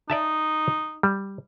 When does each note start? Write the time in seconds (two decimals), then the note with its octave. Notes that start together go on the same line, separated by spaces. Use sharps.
0.10 D#4 D5 E5 A5
1.03 G3